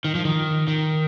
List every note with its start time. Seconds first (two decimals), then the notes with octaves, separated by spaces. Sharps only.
0.05 D#3
0.15 F3
0.25 D#3
0.68 D#3